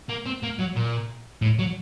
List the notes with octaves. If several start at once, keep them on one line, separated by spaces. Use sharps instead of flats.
A#3
C4
A#3
F#3
A#2
A2
F#3